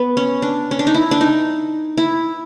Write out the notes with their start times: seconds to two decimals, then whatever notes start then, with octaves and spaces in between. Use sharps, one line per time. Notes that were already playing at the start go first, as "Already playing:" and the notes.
Already playing: B3
0.17 C#4
0.42 D4
0.71 C#4
0.79 D4
0.87 D#4
0.94 E4
1.11 D4
1.21 D#4
1.97 E4